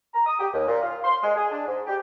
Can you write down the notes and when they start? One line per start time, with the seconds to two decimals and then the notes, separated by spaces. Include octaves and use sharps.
0.14 A#5
0.27 D#6
0.40 G4
0.54 D#2
0.68 A#2
0.82 F4
1.04 C6
1.23 G#3
1.36 G#4
1.52 D4
1.67 G#2
1.87 G4